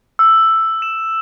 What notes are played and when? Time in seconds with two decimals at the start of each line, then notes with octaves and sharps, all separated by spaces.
0.19 E6
0.82 E7